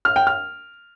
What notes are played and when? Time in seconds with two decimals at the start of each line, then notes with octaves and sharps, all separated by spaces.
0.05 F6
0.16 G5
0.27 F6